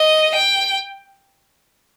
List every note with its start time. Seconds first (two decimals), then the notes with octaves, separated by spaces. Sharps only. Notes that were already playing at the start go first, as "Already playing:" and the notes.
Already playing: D#5
0.34 G5